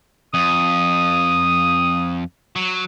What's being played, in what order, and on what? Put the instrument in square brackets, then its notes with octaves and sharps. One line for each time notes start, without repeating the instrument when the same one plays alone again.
[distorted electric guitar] F2 [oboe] D#6
[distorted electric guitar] F#3